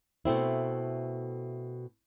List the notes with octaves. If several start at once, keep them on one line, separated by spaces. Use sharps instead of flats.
B2 A3 C4 E4